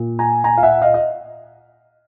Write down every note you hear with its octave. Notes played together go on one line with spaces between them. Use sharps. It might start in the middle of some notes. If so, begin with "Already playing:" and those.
Already playing: A#2
G#5 A#5
G#5 A#5
F5
E5 F#5
D#5 F5
D#5